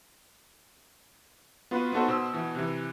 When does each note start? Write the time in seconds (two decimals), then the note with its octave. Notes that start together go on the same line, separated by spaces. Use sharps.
1.71 B3 F4 F#4 B4
1.93 B3 D#4 F#4 A4 B4 C5
2.08 B2 C5 E6
2.34 B2 E3
2.55 C3 E3